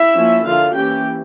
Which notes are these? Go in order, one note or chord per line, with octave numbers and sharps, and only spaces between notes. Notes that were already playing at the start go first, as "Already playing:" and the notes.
Already playing: E4 E5
F3 A#3 C#4
D3 F3 A#3 F4 F5
E3 A#3 C#4 G4 G5